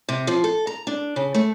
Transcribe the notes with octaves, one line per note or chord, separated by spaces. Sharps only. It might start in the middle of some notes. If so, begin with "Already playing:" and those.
C3
F3
A4
A#5
D4
C#3
A3